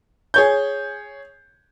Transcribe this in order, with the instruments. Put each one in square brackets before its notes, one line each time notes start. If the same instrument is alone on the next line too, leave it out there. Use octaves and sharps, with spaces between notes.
[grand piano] G#4 C#5 G6